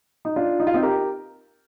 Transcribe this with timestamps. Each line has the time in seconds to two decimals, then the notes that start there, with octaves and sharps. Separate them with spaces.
0.25 D#4
0.36 D4 F4
0.60 D#4
0.67 F4
0.74 C4 D#4
0.83 G4 A#4